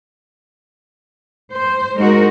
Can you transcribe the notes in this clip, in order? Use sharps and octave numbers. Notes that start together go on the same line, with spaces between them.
C5
G#3 D#4 F#4 A#4